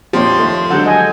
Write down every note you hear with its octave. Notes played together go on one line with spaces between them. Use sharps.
F2 A#2 F3 G4 C#5 C6
D#2 A3
D3 F#3 G#3 A4 F#5 G6
D#5 G#5